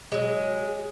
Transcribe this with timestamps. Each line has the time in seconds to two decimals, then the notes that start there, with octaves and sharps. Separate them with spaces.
0.12 F#3 G#3